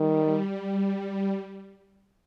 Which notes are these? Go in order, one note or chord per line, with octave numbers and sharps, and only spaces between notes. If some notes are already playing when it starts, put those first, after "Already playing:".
Already playing: D#3 G3